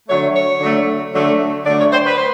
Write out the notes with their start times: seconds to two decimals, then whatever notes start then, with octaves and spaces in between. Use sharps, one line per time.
0.08 D3 F#3 A3 C#5
0.34 C#5
0.60 D3 F#3 A3
1.14 D3 F#3 A3
1.66 D3 F#3 A3 D5
1.79 C#5
1.92 C5
2.06 B4
2.16 C5